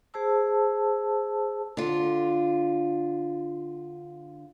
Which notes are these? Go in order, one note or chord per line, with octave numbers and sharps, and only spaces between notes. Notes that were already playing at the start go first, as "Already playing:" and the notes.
G#4 C5 A5 E6
D3 F4